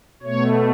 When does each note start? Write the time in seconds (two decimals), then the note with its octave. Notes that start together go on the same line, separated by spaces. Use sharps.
0.23 B2 A3 C#5